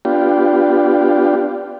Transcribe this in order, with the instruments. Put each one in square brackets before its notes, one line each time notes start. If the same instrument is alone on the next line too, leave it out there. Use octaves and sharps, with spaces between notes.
[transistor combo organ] B3 D4 F4 G4